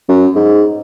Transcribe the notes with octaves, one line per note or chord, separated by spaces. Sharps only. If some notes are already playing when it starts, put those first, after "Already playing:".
F#2
G#2